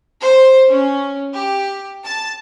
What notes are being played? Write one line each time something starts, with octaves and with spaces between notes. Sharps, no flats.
C5
C#4
G4
A5